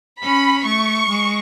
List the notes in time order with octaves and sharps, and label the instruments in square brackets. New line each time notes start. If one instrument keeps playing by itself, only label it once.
[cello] C#4 [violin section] B5
[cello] A3 [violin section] C#6
[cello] G#3